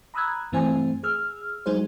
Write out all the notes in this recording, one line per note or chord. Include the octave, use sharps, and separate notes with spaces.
A#5 B5 D#6 E6 F#6 G#6
G2 E3 A3 C4 C5 G#5
G#4 E6 F6
F#3 G#3 D#4 G#4 C5